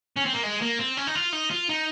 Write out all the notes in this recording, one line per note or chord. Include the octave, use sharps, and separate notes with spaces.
C#4
C4
A#3
G#3
A#3
C4
C#4
D#4
F4
D#4
F4
D#4